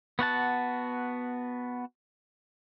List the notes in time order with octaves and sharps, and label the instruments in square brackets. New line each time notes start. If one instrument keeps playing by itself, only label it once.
[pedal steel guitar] B3 F#4 F#5 A5